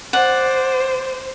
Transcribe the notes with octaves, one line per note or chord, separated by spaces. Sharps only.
C5 D5 F#5